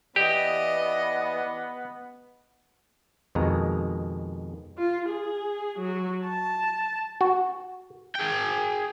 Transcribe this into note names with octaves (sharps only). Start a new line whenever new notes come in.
E3 B3 G4 D5 D#5
F2 B2 D#3 G#3 A#5
F4
G#4
F#3
A5
F#4
G#4 G5